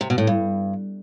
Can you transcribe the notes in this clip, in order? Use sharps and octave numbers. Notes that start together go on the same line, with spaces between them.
C3
B2
A2
G2